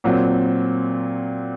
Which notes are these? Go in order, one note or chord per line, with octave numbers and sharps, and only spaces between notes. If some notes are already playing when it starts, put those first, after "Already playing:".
A#2 F#3 C4